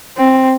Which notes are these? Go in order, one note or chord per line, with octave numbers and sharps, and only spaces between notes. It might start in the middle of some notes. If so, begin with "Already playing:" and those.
C4